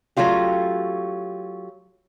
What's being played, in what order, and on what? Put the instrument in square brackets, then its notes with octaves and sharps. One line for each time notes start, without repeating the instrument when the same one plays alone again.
[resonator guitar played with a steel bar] F#3 A3 C#4 F4 G4